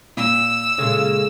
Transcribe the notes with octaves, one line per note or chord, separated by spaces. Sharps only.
A#2 E6
A#2 C#3 G#3 C#4 A4